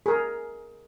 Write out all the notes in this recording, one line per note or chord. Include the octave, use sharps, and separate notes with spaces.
G#4 A#4